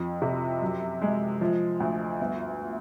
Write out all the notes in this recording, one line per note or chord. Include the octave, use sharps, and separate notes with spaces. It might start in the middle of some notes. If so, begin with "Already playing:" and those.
Already playing: F2
C3
F#2
G#3
F3
D2
G1